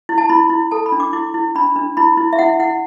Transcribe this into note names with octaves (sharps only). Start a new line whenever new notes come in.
E4
A5
E4 B5
E4
A4 A5
B5
D4
D6
E4 D6
E4
D4 B5
D4
E4 B5
E4
E5
E4 F#5
E4 F#5